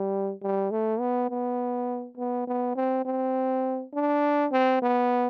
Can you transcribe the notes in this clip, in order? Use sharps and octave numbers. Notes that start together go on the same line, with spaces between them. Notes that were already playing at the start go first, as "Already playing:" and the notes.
Already playing: G3
G3
A3
B3
B3
B3
B3
C4
C4
D4
C4
B3